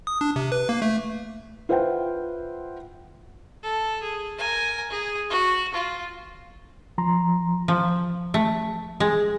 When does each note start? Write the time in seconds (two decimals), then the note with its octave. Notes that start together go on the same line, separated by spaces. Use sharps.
0.07 D#6
0.21 D4
0.36 C3
0.52 B4
0.69 A#3
0.82 A3
1.69 F4 B4 C5 E5 F#5 G5
3.63 A4
4.02 G#4
4.38 A#4 G#5
4.91 G#4
5.30 F#4
5.74 F4
6.98 F3 A#5 C6
7.68 F3
8.34 A3
9.00 G#3